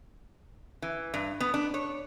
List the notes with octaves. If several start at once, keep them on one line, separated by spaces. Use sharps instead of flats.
E3
G2
B3
D4
C#5